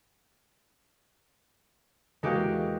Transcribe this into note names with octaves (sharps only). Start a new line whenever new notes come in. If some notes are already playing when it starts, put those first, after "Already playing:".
E2 G#3 A#3 F#4 G4 F5